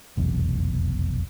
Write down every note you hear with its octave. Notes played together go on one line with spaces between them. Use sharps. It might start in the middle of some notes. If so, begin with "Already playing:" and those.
F1 B1 E2